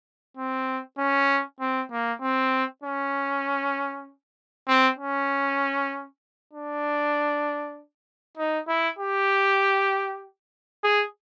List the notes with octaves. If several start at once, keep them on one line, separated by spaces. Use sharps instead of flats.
C4
C#4
C4
A#3
C4
C#4
C4
C#4
D4
D#4
E4
G4
G#4